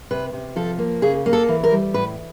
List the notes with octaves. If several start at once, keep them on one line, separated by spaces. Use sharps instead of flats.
C3 B4
C3
F3 A4
A#3
C#3 G#4
A#3
A4
E3
A#4
G3
A2 B4